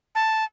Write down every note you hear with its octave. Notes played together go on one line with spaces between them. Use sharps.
A5